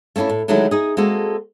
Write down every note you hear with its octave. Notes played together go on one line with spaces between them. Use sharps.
A3 A#3 C#4 D4 E4
A2
D3 D#3 F#3 G#3 A3 E4
D#4 G#4
G#3 A#3 C4 F#4 A4